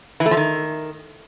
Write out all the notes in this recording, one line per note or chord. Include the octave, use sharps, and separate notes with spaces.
E3
A3
F3
D#3